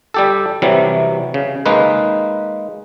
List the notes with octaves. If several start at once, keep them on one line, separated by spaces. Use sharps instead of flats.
G3 G4 A4
C3 E3 F#3 G3
C#3
G#3 A#3 D#4 B4